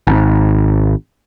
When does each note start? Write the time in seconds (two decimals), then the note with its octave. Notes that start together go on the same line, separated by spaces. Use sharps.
0.07 G#1